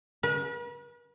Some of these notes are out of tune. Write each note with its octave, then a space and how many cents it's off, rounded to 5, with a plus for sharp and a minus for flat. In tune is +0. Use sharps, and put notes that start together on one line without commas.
B4 -45